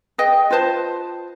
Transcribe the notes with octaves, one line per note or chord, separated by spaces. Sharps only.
G#4 B4 D#5 G5
F4 B4 C5 A5